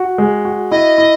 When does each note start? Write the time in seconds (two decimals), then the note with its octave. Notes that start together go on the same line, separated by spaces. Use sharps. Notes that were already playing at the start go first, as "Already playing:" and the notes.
Already playing: F#4
0.18 G#3
0.45 F#4
0.71 E4 D#5
0.98 E4